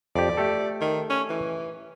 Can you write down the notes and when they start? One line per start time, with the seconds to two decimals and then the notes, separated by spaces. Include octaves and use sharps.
0.16 F2 G4 D5
0.37 A3 G4 A4
0.81 D#3
1.10 C#4
1.30 E3